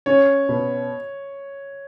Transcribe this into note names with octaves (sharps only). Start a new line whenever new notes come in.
C#4 C#5
B2